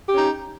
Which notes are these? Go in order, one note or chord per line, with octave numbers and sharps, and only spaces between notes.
C#4 D#4 G4